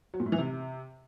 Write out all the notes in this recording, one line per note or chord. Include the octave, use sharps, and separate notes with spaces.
F#3
A#2
A2
E3
C3